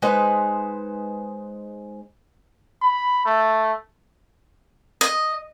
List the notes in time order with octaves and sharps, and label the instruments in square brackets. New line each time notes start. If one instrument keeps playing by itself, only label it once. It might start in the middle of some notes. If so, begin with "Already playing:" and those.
[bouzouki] G#3 D#4 B4 C5
[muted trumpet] B5
A3
[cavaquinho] D#5